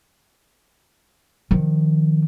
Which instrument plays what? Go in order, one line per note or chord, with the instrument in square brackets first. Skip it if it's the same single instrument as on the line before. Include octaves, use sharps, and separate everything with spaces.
[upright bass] D#3 F3